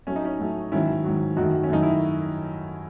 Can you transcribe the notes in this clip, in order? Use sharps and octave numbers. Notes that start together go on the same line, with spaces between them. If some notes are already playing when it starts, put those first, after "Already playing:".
A2 F#3 A3 C#4
D#4
C#4
A2 F#3 A3
G#2 D#3 F#3 C#4 E4
G#2 D#3 F#3
F#2 D#3 F#3 A3 D#4 F#4
C#4
F#2 D#3 F#3 A3 D#4
E4